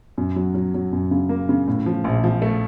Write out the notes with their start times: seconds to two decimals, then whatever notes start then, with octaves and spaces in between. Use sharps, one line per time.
0.18 F#2
0.36 F#3
0.55 F#3
0.74 F#3
0.93 F#2
1.11 C#3
1.29 A#3
1.49 C#3
1.68 A2
1.86 F3
2.04 A#1
2.24 F3
2.42 A3